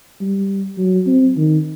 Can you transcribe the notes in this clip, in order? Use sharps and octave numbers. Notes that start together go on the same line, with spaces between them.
G3
F#3
C4
D#3